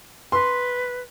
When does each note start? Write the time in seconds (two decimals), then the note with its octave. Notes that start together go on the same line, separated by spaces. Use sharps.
0.32 B4 C6